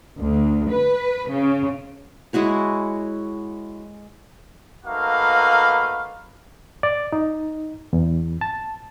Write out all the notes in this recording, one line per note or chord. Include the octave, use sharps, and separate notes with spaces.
D2
B4
C#3
G#3 E4 F#4 C#5
A3 A#3 D#4 F#4 B4 F5
D5
D#4
E2
A5